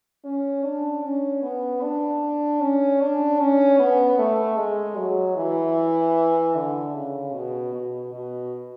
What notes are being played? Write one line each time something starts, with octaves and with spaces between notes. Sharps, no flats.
C#4
D4
C#4
B3
D4
C#4
D4
C#4
B3
A3
G#3
F#3
E3
D3
C#3
B2
B2
B2